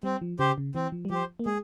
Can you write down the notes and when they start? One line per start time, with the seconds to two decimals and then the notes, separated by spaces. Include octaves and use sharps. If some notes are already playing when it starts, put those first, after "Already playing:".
0.03 G3 C4
0.22 F3
0.39 C#3 G4 C5
0.58 C#3
0.75 E3 C4
0.92 F3
1.05 G3
1.10 F3 G4 C5
1.39 A#3
1.45 G#3 G#4